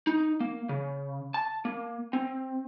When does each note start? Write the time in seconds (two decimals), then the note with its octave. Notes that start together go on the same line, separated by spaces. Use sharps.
0.07 D#4
0.40 A#3
0.69 C#3
1.34 A5
1.65 A#3
2.13 C4